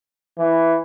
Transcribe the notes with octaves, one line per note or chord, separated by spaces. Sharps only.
E3